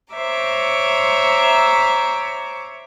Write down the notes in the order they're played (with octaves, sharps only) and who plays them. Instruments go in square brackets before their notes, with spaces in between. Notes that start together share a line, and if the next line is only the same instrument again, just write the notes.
[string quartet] C5 C#5 E5 A#5 D6